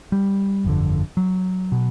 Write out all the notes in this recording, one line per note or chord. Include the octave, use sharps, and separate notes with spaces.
G3
G1 F2 D3
F#3
B2